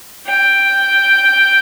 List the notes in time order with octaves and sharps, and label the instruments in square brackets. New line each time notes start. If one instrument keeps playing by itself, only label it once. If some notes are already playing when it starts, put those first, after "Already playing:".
[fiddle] G5